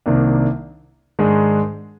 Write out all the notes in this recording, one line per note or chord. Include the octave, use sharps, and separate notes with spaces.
C2 C3 D#3 A#3 D4
G#2 D#3 G#3 D4 G#4